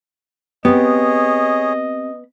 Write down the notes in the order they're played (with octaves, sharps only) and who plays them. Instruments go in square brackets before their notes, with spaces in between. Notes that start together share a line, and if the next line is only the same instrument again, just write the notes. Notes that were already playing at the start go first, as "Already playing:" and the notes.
[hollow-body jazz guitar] B3 [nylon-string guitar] C4 G4 [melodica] G#4 C#5 [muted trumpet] D#5